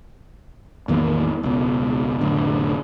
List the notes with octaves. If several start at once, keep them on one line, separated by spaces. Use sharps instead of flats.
A1 E2 D#3 A#3
E1 C#2 B2
F1 A2 D3